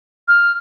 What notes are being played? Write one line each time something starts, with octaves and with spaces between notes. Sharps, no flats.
F6